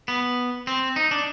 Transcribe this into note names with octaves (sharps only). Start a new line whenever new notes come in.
B3
C4
D#4
D4